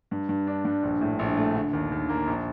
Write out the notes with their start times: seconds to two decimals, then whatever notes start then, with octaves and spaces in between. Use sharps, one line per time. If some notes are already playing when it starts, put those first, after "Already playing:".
0.11 G2
0.29 G2
0.47 D4
0.65 G2
0.83 A#1
1.01 A2
1.19 A#1
1.37 A3
1.55 D3
1.73 D#2
1.92 D#2
2.09 A#3
2.27 A#1